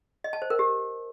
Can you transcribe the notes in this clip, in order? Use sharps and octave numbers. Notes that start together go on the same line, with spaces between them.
D#5
A5
C5
A#4
G4